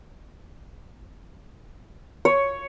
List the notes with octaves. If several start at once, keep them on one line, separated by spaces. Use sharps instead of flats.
C#5